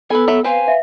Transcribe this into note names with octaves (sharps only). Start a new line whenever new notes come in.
B3 A4 B4 G#5
F#3 E5
C4 B4 C5 F5 G#5
E5